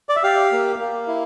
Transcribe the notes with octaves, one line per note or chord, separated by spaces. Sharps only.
D5
E5
G4 F5
A#3
A#3
E4